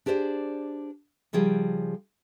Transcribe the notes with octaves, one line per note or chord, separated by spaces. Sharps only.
D4 G4 G#4 C5 D5
C#3 F3 G3 G#4 G5